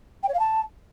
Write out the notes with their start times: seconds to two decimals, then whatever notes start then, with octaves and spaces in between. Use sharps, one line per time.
0.23 G5
0.28 C#5
0.34 F5
0.39 A5